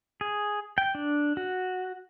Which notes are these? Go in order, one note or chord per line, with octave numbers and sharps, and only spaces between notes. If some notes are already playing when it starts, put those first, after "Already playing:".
G#4
G5
D4
F#4